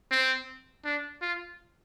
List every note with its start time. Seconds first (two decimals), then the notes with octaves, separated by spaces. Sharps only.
0.11 C4
0.85 D4
1.22 F4